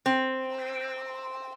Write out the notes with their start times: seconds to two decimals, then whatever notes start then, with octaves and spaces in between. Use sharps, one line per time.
0.06 C4